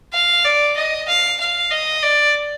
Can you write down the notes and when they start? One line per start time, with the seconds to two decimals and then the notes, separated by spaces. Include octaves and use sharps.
0.14 F5
0.45 D5
0.77 D#5
1.09 F5
1.40 F5
1.71 D#5
2.03 D5